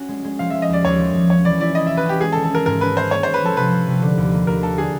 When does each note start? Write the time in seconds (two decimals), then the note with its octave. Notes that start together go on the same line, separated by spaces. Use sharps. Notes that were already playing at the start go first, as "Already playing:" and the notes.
Already playing: C#4 F#4
0.09 G#3
0.25 G#3
0.39 F3 F5
0.50 F3 E5
0.62 D#5
0.69 D#2 D5
0.85 D#2 C#5
0.99 F3
1.14 D#2
1.30 C#4 C#5
1.44 E3 D5
1.60 E4 D5
1.75 E4 D#5
1.87 E4 E5
1.97 B4
2.05 C#4 G4
2.21 G#3 G#4
2.33 A4
2.36 D#3
2.44 A4
2.51 C#4 A#4
2.66 G#2 A#4
2.81 C#4 B4
2.96 G#3 C5
3.11 A#3 C#5
3.23 D#4 C5
3.34 B4
3.42 F3 A4
3.57 C3 B4
3.72 F3
3.87 C3
4.02 D3
4.18 D#2
4.33 A#3
4.47 D#2 A#4
4.62 A#3 A4
4.78 D3 G#4